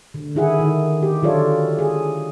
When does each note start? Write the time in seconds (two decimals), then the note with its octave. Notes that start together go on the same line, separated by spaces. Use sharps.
0.14 D3
0.35 D#3 E4 G#4 F#5
0.59 D#3
1.03 G4
1.22 D3 F#3 F4 A4 C#5 D5
1.79 G#4